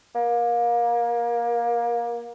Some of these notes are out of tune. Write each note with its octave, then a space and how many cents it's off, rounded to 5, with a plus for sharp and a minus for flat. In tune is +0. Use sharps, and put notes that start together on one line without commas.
A#3 +25